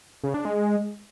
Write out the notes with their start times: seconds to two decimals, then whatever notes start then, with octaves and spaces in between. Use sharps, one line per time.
0.23 C#3
0.34 D4
0.45 G#3